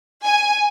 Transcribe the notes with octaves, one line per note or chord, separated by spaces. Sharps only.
G#5